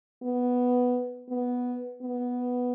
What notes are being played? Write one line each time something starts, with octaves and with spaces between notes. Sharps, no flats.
B3
B3
B3